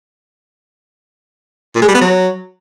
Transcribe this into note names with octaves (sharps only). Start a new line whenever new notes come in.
A#2
G#3
G3
B3
F#3